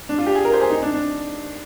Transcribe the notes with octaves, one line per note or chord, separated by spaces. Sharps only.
D4
F4
G4
G#4
A#4
C5
G#4
D#4
D4
D4